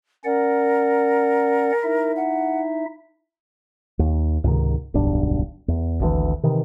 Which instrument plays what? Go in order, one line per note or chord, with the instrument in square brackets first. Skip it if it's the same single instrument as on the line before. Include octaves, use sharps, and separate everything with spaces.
[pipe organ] C#4 D5 F#5 [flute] A#4
[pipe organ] D#4 E4 E5
[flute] F#5
[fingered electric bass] D#2
C#2 G#2 C3 D#3
D1 B1 G2 D4
E2
G#1 D2 E3
C3 D#3 E3